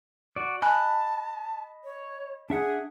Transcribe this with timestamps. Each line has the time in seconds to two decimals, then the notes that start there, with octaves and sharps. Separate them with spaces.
0.36 F#4 D5
0.62 D#5 G#5 A5 B5 F#6
1.84 C#5
2.50 D4 G#4 E5 F#5